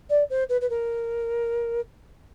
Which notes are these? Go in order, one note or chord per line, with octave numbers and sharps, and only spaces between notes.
D5
C5
B4
B4
A#4